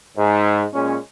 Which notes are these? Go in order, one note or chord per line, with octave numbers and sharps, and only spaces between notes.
G#2
A#2 G#3 C#4